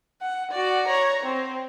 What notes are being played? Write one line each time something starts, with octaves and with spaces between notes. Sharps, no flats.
F#5
F#4 D5
C#5 A#5
C4